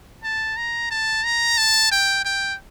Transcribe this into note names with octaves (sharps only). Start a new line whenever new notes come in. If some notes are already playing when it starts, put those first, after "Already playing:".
A5
A#5
A5
A#5
A5
G5
G5